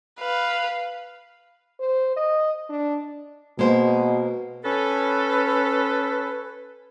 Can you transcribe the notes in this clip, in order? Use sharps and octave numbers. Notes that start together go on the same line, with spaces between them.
B4 F5
C5
D#5
D4
B2 G#3 A#3 C5
C#4 A4 B4